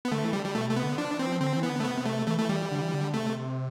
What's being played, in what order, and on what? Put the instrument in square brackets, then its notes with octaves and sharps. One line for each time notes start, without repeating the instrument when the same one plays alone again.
[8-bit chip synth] B3
[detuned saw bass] D3 [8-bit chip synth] A3
[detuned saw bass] E3
[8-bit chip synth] G3
[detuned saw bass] D3
[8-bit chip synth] G3
[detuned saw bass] B2 [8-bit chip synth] A3
[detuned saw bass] C3 [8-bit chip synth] A3
[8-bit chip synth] B3
[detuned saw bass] D3
[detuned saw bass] F3 [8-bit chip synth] D4
[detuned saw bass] E3
[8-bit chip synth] C4
[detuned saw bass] F3
[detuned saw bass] D3 [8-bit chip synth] C4
[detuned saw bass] E3
[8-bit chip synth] B3
[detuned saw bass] D3
[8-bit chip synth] A3
[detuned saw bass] C3 [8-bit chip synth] B3
[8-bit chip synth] A3
[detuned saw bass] E3 [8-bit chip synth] A3
[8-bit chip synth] A3
G3
[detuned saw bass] D3
E3
D3
[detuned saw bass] C3 [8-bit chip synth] A3